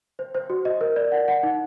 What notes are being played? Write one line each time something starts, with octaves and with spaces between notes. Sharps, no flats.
C5
C5
F#4
D#5
A#4
D5
F#5
F#5
D#4